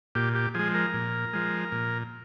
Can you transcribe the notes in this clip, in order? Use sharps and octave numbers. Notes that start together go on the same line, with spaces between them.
A#2 G4
G4
F3 G#3 G#4
A#4
A#2
F3 G#3
A#2